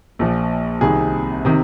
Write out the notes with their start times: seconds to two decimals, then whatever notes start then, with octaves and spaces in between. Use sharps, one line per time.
0.19 A#1 A#2 F3
0.81 C2 C3 D#3 G#4
1.45 C3 D#3